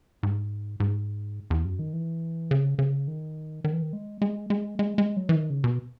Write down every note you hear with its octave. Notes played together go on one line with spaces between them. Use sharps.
G#2
G#2
E2
F#2
D#3
E3
C#3
C#3
D#3
D#3
E3
D#3
G#3
G#3
G#3
G#3
G#3
F#3
E3
D#3
C#3
B2